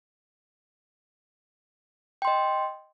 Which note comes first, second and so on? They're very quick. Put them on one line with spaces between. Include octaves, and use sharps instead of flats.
G5 C6 D#5